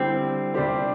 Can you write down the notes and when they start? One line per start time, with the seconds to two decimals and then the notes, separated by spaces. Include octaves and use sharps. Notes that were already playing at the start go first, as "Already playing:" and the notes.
Already playing: D3 G3 C4 E4
0.54 C3 G3 D4 G4 C5